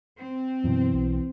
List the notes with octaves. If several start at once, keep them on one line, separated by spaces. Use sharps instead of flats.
C4
F#2 B2 E3
B1